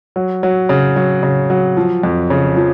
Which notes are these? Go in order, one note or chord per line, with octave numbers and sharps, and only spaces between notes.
F#3
F#3
C#3
F#3
C#3
F#3
F3
F2
C#3
F3